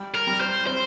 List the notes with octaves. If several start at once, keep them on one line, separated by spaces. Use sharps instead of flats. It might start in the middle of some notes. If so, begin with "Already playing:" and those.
Already playing: G3
A#4
G3
C5
C4 C5